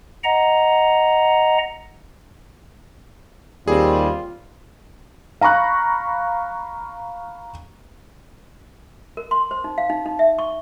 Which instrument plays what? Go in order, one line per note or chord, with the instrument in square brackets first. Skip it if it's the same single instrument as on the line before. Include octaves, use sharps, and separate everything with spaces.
[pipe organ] D#5 F#5 A#5
[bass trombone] D#2 [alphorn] G3 [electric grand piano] C4 G#4 [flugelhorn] F4
[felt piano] F5 A#5 B5 C#6 F#6
[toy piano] A#4
C6
C5
D#4
F5
D#4
D#4
E5
C#6